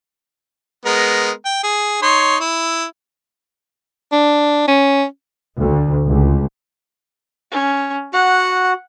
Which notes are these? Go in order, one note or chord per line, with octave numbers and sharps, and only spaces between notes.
G#3 B3 A#4
G5
G#4
D#4 C#5 C6
E4
D4
C#4
D2
C#2
C#4
F#4 F#5